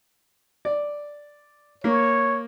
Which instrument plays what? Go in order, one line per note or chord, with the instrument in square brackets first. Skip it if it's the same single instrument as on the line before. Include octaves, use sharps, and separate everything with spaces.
[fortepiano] D5
[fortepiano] A#3 [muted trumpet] C#5